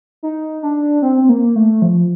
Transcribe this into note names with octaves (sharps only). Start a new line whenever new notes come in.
D#4
D4
C4
C4
A#3
A3
F3